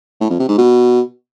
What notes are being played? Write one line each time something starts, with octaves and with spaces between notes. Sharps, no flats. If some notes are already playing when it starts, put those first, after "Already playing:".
A2
F2
C3
G#2
B2